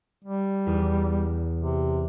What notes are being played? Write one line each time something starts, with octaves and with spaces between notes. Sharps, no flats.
G3
E2
C3